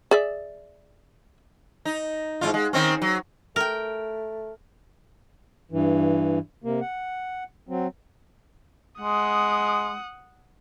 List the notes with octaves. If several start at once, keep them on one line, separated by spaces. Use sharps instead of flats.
G#4 D5 E5
D#4
G#2 C#3 F4
G#3
D#3 C4 C#4
F#3
A3 A#4 G5
G2 E3
C3 A#3
F#5
F#3 C4
G#3 F#5 D#6